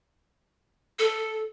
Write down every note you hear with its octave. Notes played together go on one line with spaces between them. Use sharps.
A4